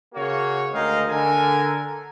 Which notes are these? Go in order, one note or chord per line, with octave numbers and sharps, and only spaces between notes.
C#3 A#3 F#4 C#5
D2 G#3 A#4 D#5 F5 G5
D3 A#4 G#5